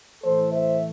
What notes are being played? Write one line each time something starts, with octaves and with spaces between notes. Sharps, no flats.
A2 E3 A3 A4 C5
C5 E5